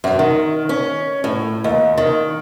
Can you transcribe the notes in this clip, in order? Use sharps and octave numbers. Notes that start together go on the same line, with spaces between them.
F#2
D#3
C#4
A2
D#2
D#3